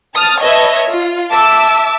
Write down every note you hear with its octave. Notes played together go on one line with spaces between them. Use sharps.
A5 D#6 F6 A6
B4 C#5 D#5 E5 A5
F4
E5 A5 D6 E6